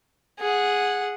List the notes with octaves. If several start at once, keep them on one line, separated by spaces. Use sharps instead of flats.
G#4 F#5